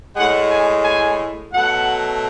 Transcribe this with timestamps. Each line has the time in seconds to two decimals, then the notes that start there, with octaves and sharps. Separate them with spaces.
0.16 A2 G#3 F#5
0.50 G#5
0.84 G#5
1.53 B2 F#3 A3 F#5